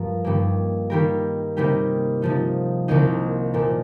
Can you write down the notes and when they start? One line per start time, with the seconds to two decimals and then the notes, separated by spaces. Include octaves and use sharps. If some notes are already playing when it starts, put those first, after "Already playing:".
Already playing: G2 F3 F4 A#4
0.25 G2 D#3 A#3
0.90 D#3 G3 A#3 G4 A#4
1.57 C3 G3 A#3 D#4 G4
2.22 C3 F3 D#4
2.88 C2 C3 D#3 A#3 D#4
3.54 A#2 F3 A#3